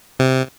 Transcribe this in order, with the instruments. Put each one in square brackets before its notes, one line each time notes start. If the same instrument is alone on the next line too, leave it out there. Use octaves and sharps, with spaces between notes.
[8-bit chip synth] C3